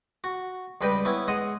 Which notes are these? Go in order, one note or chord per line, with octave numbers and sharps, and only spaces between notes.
F#4
C#2 G3 B4 D#5 G5
B3 C#4 E4
G#3 D#5 F#5 D#6